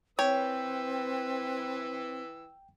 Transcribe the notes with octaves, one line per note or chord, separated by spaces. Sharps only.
E3 C4 B4 C#5 G5 E6